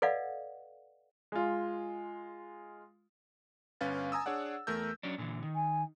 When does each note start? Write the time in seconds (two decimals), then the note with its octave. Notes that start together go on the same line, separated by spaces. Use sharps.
0.02 A4 B4 D5 D#5 F5 F#5
1.32 G#3 F4
3.81 G1 C#4 B4 F5 A6
4.12 G#5 A#5 D#6 E6
4.26 D4 G#4 C#5 D5 F#5
4.67 E2 A3 A#4 E6 G6
5.03 F#3 C#4 D4
5.18 A#2 D3 E3
5.43 D#3
5.55 G#5